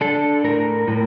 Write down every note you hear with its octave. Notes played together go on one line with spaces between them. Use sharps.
D4 A4
A2 A#4
A2